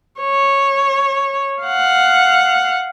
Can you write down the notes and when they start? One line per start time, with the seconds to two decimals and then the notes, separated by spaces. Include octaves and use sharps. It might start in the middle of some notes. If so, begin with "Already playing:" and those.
0.21 C#5
1.63 F5 F#5